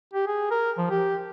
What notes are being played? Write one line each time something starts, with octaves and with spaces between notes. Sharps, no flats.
G4
G#4
A#4
F3
G4